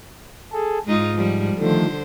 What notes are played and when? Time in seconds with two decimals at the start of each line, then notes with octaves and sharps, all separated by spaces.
0.52 G#4 A4
0.87 G#2 G#3 D#4 F4
1.17 F3 G3
1.59 D3 D#3 F3 A3 C5